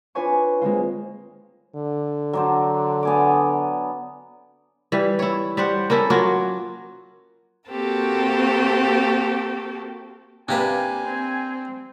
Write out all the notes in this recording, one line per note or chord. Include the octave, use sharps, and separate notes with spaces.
D4 F4 B4 C#5 G#5 C#6
G#3 A#3 C4 F4
D3
F#3 D4 C5
B3 G#5 D6
E3 G3
E4 C#5
G3 C5 F#5
A#3 C#4 E4 A4
F#3 A#3 F4 F#4
A#3 C4 F#4 G4 A4 A#4
C3 A#3 D4 G4 B4 F5 G#5
C4